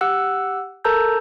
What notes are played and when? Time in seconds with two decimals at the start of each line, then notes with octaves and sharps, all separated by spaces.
0.01 G4 F#5 E6 F#6
0.85 A4 A#4 A5 A#5 E6 G6